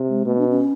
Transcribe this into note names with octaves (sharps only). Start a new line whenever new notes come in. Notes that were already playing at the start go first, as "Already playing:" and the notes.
Already playing: C3
G#3
B2 A3
D4
C#4